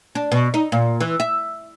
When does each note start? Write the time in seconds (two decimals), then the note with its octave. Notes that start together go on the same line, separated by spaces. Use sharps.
0.15 D4
0.32 B2
0.54 D#4
0.72 A#2
1.00 E3
1.20 E5